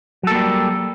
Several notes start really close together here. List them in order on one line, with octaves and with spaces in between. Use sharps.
F#3 A4 A#3 G3